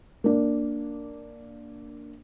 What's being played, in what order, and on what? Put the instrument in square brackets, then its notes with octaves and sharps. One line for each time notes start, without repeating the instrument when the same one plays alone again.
[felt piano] A#3 D4